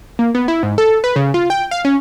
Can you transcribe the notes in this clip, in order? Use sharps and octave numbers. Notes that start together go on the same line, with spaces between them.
A#3
B3
E4
G#2
A4
B4
C#3
F4
G5
F5
C#4